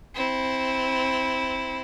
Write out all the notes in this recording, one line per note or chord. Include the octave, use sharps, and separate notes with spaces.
C4 E4